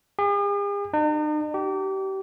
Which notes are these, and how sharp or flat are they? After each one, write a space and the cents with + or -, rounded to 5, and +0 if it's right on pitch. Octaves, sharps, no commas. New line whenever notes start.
G#4 -45
D#4 -45
G4 -30